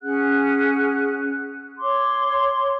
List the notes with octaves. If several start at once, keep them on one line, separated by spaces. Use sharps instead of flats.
C#4 G#4 F#5 F#6
C#5 C6 D6